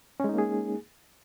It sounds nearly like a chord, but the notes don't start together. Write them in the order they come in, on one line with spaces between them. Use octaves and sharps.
C#4 G#3 D#4 A#3 G#4